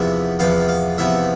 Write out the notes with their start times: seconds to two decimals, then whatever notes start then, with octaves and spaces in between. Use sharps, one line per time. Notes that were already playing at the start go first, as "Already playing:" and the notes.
Already playing: E2 C3 F3 B3 E5
0.39 E2 C3 F3 B3 F5
0.68 F5
0.98 E2 C3 F3 B3 E5